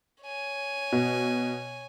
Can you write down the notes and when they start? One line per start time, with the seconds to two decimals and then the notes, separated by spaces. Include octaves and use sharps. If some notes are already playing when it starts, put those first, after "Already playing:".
0.23 C#5 G#5
0.92 B2